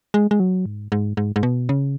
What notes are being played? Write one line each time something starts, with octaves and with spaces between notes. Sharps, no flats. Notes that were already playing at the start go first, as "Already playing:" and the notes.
G#3
G#3
F#3
G#2
G#2
G#2
G#2
B2
C#3